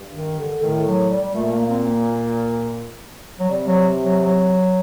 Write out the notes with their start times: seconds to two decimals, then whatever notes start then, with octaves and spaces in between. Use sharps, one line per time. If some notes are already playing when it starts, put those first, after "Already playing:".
Already playing: G2
0.14 D#3
0.39 D3
0.62 A2 D#3
0.87 F#3
1.10 G3
1.34 A#2 A3
1.52 A#3
1.66 A#3
1.70 C4
1.87 A#3
3.40 F#3
3.49 C3 G3
3.67 F#3
4.03 F#3
4.21 F#3